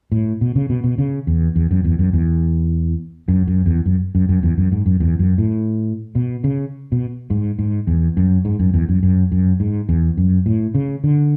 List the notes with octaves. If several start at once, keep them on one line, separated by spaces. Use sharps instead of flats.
A2
B2
C#3
B2
B2
C#3
E2
E2
F#2
E2
F#2
E2
F#2
F#2
E2
F#2
F#2
F#2
E2
F#2
G#2
F#2
E2
F#2
A2
B2
C#3
B2
G#2
G#2
E2
F#2
G#2
F#2
E2
F#2
F#2
F#2
G#2
E2
F#2
A2
C#3
D3